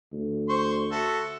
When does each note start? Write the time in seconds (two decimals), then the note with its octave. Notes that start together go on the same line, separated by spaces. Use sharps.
0.12 D2
0.49 C5 C6 C#6
0.91 F#4 A4 E5